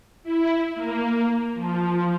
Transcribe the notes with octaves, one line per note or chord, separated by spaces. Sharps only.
E4
A#3
F3